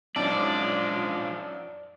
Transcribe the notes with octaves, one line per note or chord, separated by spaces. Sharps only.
F#2 F3 G#3 D4 D#4 D5 A5